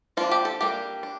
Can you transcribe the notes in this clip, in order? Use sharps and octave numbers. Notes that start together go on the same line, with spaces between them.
F3 A#3 D4 F4
G4
A4
G3 A#3 D4 G4
D4